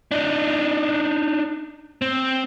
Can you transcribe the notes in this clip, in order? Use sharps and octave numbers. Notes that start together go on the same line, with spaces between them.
D4 D#4
C4